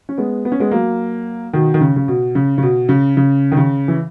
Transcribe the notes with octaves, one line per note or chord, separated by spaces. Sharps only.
C#4
G#3 B3
B3
C#4
G#3 B3
F#3 A#3
B2 D#3
D#3
C#3
C#3
B2
C#3
C#3
B2
C#3
C#3
D#3
C#3
E3